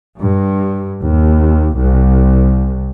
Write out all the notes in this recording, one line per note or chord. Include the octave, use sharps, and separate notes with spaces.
G2
D#2
C2